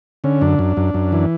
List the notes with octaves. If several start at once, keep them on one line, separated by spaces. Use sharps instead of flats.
D3 C#4
F#2 D4
F#2
F#2
F#2
E3